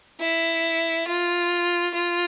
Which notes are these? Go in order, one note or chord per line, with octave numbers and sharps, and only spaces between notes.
E4
F4
F4